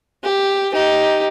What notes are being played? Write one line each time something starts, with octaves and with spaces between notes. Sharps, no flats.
G4
D#4 G4